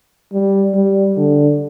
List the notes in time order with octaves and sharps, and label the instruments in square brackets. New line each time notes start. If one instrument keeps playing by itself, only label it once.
[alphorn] G3
G3
D3